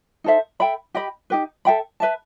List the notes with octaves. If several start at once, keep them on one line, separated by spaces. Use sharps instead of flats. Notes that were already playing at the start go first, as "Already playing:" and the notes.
D#4 A4 C5 E5
A4 E5 G5 B5
G4 D#5 G5 B5
D#4 G4 B4
A4 E5 G5 B5
B4 E5 A5